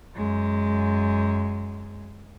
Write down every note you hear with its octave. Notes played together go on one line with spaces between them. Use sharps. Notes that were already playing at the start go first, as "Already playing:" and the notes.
F#2 G#3